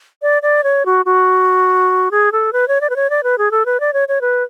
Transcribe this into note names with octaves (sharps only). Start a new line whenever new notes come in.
D5
D5
C#5
F#4
F#4
G#4
A4
B4
C#5
D5
B4
C#5
D5
B4
G#4
A4
B4
D5
C#5
C#5
B4